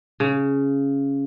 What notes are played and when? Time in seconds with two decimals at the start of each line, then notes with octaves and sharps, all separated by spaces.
0.20 C#3